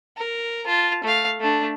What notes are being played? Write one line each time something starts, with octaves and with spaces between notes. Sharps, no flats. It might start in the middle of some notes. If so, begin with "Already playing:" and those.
A#4
F4 A5
A3 F5
A3 D4